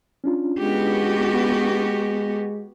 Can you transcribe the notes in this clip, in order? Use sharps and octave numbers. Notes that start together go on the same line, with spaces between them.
C#4 D4 F4
G#3 B3 F#4 G4